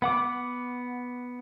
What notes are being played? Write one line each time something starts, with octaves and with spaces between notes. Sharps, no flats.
B3 F#5 D6